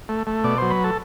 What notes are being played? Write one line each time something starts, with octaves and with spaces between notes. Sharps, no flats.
A3
A3
B2 D5
F#3 C5
B4
A4